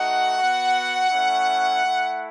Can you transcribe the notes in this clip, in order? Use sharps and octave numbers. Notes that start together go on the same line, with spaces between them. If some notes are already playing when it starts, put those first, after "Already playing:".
Already playing: A3 D#4 F#4 F#5
B3 F#4
A3 C#4 E4
A3 E4